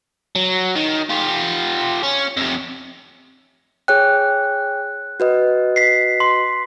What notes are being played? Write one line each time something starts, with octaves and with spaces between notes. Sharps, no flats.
F#3
D#3
F4 G4
C#4
F2 C3
G#4 C#5 G5 F#6
F#4 B4 D#5
B6 C7
C6